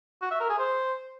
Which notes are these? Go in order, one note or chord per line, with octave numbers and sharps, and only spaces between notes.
F#4
E5
A#4
G#4
C5